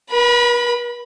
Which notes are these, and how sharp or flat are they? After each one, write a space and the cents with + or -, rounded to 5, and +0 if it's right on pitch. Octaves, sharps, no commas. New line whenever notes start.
B4 -45 B5 +0